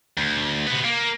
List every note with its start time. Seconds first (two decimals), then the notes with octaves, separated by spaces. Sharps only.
0.18 D2
0.67 C3 B3
0.84 A#3